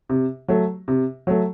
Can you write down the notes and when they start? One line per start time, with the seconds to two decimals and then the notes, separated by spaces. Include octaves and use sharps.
0.09 C3
0.48 F#3 A3
0.88 C3
1.27 F#3 A3